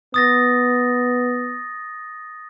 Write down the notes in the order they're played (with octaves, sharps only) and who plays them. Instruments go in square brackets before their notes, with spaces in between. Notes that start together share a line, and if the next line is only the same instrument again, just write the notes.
[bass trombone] B3 [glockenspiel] D#6 A6 A#6